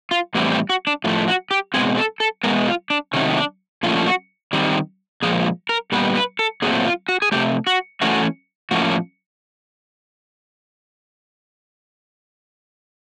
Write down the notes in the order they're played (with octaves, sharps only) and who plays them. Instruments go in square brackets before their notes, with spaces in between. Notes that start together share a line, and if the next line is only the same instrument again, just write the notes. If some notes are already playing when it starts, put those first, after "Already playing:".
[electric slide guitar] F4
A2 E3 G3 C4 F#4
G4
F#4
D4
A2 F3 A3 F4
F#4
G4
B2 G#3 C4 G#4
A4
A4
B2 G#3 B3 A#4
F4
D4
C3 D#3 F#3 A3 C#4
D4
A#2 F3 A3 C#4 F4
F#4
D#3 G3 C4
A#2 F3 G#3 G#4
A#4
A#2 G3 B3 B4
B4
A4
A#2 F#3 A3 C4 G#4
F4
F#4
G#4
C3 F3 A3 G4
F#4
E3 A3 C#4 F#4
A2 F3 A#3 C#4 F#4